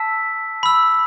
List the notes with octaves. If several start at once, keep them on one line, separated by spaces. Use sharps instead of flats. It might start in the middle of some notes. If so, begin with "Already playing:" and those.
Already playing: A5 E6 B6
B5 E6